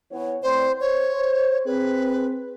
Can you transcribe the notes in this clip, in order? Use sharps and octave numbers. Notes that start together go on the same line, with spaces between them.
E3 B3 C#5
A2 C4 C5 D5
C5 C#5
C4 G#4 B4